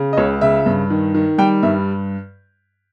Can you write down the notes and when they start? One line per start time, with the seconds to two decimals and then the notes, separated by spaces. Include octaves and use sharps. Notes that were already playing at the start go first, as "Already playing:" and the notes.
Already playing: C#3
0.13 D#5
0.17 C#2 C#5
0.41 C#3 E5
0.66 G2
0.90 D#3
1.15 D#3
1.38 G3 G5
1.63 G2 E5